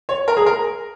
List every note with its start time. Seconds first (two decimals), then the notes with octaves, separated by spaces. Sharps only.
0.09 C#5
0.28 A#4
0.37 G#4
0.46 A#4